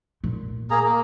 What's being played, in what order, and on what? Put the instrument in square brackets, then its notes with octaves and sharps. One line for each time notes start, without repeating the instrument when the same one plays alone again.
[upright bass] A#2
[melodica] A#3 G#4 A#5
A#3